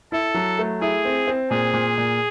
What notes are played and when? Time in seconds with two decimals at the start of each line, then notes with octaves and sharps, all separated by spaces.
0.12 E4 A4
0.34 F#3
0.59 A3
0.81 E4 G#4
1.05 C4
1.27 C4
1.50 A#2 G#4
1.74 A#2
1.98 A#2